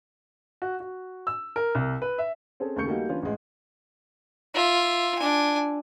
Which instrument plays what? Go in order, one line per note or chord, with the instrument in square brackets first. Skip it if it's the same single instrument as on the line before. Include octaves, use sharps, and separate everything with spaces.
[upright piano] F#4
F#4
E6
A#4
C2
B4
E5
[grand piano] C4 C#4 G#4 A4
D#2 C#3 A3 C#6 G6 C#7
G3 A3 A#3 D#4 F#4
E3 C#4 D4 F4
A1 G#3
[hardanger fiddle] F4 E5
D4 G#5